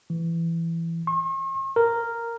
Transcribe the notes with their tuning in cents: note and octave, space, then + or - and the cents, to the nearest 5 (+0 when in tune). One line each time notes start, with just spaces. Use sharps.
E3 +15
C#6 -45
A#4 -5